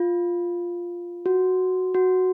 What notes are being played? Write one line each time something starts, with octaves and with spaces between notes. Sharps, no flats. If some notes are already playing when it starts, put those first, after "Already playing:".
Already playing: F4
F#4
F#4